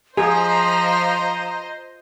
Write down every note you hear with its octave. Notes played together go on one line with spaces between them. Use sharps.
F3 G#4 C5 D#5 A#5